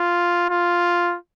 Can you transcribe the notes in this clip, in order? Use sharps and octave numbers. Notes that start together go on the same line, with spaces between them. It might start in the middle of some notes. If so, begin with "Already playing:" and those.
Already playing: F4
F4